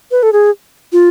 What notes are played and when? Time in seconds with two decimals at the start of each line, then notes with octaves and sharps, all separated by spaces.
0.11 B4
0.23 A4
0.33 G#4
0.93 F4